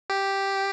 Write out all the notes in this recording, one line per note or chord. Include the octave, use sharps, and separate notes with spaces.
G4